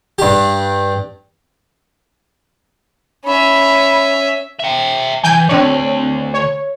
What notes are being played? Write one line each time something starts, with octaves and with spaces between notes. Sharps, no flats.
G2 G4
C#4 E5 B5
E5 G5
E3 G5 G#5 G6
D2 C4 D4 C#5
C#5